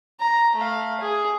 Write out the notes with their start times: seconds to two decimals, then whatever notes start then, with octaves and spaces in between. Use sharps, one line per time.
0.20 A#5
0.55 A3 F5
1.01 G#4